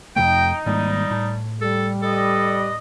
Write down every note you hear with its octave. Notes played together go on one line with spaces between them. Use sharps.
F2 C3 A3 D#4 G5
G#1 G#2 G3 A#3
A2
G3 A4
A4 B4 D5 D#5